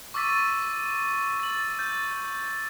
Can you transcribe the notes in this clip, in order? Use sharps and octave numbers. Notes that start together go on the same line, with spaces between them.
C#6 D6 E6 A6 B6 D#7
A6 F#7
G6 A6